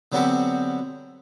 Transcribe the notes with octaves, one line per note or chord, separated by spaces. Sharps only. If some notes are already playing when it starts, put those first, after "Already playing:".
D3 F#3 B3 C4 F#4 G4